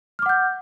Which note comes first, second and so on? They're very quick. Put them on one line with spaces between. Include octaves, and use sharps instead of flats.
F6 D6 F#5 G6